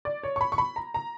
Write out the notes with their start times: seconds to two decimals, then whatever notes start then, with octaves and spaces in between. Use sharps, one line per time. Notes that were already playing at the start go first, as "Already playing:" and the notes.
0.05 D5
0.23 C#5
0.36 C#6
0.41 B5
0.52 C#6
0.58 B5
0.76 A#5
0.94 A#5